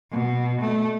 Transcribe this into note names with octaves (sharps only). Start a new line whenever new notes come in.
B2
A3